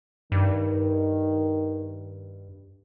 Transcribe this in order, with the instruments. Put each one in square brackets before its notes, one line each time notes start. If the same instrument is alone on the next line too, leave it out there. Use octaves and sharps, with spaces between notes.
[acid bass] G2 [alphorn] D#3